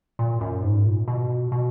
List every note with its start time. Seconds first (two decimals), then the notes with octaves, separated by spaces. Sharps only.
0.19 A#2
0.41 F#2
0.63 G#2
0.86 A#2
1.08 B2
1.52 B2